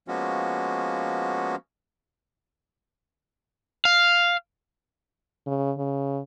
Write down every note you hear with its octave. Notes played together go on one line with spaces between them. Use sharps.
F3 G#3 A#3 B3 C#4 F#4
F5
C#3
C#3